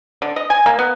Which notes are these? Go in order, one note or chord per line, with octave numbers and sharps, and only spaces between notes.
D3
D#5
G#5
A#3
B3